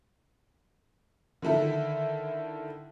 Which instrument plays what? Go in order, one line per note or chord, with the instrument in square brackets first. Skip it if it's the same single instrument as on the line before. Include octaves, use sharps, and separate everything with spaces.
[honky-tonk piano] D3 D#3 E4 A4